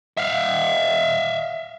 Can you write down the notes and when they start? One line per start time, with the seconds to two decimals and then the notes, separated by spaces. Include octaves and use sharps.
0.17 E5 F5